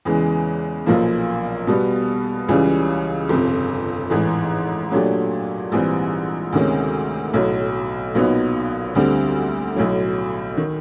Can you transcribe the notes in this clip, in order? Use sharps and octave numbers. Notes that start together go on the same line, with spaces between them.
E2 C#3 E3 G#3
B1 A#2 F3 A#3
B2 G3 B3
C#2 C#3 E3 G3
G1 F2 C3
A1 G#2 E3
A#2 F#3 A3 D4 G4
A#1 G#2 E3 G3 C4
D2 C3 D#3 G#3 C#4
B1 A2 F#3
B1 A#2 F#3 B3 D#4
D2 D3 G3 C4
B1 A2 F#3
D#3